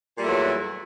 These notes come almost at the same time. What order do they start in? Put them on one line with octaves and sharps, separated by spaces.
A#2 G3 A3 E2 F#3